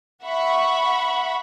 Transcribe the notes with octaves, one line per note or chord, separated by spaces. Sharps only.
E5 F#5 B5 C#6